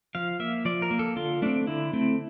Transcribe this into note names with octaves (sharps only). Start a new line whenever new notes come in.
F3 F5
A#3 E5
F3 D5
A#4
A#3
A4
D3 F4
A3 C4 D4
D3 E4
A3 C4